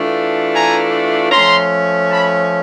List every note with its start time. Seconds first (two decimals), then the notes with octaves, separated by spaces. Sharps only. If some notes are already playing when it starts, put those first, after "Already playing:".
Already playing: E3 A3 D4 F4
0.53 G#5 A#5
1.32 F3 A3 C#4 A#5 C6
2.11 A5 B5